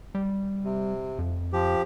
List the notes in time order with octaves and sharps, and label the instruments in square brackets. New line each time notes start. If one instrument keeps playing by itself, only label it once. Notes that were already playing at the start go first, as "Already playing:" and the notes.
[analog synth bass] G3
[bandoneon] C3
[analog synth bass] F2
[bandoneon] F3 G4